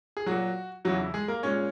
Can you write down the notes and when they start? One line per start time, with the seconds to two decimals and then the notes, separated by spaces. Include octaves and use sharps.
0.17 G#4
0.26 A#2 F#3 F#4
0.85 E2 C#3 E3 F#3 F#4
1.00 E4
1.14 G#3 G#4
1.28 A#3 A#4
1.43 A#2 G#3 C#4 C#5